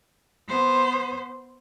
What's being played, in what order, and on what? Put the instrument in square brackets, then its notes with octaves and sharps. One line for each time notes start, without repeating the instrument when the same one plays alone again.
[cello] B3 C5